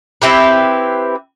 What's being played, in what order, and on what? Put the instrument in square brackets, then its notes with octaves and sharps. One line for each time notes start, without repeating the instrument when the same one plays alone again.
[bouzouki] C4 E4 G4 B4